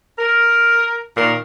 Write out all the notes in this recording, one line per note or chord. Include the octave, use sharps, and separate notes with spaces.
A#4
A#2 D#3 A#4